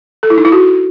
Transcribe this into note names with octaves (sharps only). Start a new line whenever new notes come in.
A4
E4
D#4
E4
F#4